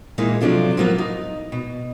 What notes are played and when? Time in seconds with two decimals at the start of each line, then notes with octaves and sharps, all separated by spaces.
0.18 A#2 E3 G#3 A#3 D#4
0.41 C3 F3 F#3 D4 F4 A4
0.77 F3 F#3 A#3 B3 F4
0.98 D#4
1.52 B2